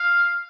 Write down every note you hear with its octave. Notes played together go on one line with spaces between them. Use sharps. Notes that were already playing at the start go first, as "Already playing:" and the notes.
Already playing: F5